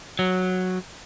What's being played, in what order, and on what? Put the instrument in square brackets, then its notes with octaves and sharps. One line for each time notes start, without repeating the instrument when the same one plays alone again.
[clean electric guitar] F#3